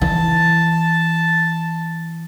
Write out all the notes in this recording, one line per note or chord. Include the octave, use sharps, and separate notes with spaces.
E3 A5